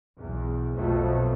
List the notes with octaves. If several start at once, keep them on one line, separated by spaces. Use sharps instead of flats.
B1 E2
B1 F2 B2 F3 F#3 A3